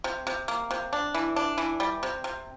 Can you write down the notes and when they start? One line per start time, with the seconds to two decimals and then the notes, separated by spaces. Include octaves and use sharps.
0.04 C3
0.27 C3
0.48 A#3
0.71 C3
0.93 D4
1.15 E3
1.36 D4
1.58 E3
1.80 G3
2.03 C3
2.24 C3